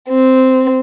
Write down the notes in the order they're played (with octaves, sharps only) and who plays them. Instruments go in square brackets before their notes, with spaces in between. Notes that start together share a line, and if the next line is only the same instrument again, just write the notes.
[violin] C4